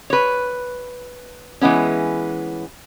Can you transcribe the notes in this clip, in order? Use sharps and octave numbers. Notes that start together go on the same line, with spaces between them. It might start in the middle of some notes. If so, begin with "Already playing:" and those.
B4 C#5
E3 G#3 B3 C#4